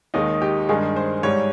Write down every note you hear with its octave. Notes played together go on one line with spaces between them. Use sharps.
D#2 D#3 G#3 D#4
G4
G2 D#3 G#3 G#4
C5
G#2 G3 C#5